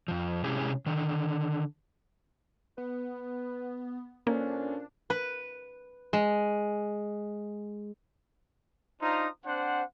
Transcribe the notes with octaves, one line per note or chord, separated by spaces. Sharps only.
F2 F3
C3 G#3 C#4 E4 G4 G#4
D3 D#3
B3 B4
A#2 A#3 C#4 D4 A4 C5
B4
G#3
D4 D#4 F4 C5 A#5 D#6
C4 D4 C5 F#5